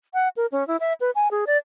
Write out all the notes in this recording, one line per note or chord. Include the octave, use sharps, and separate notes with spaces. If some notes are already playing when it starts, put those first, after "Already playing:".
F#5
A#4
C#4
E4
E5
B4
G#5
G#4
D5